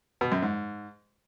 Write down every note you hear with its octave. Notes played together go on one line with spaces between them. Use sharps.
B2
F#2
G#2